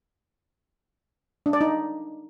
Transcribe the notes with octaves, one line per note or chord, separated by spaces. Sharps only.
D4
D5
D#4